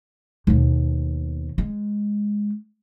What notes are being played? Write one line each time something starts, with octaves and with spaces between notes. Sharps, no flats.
D#2 B2
G#3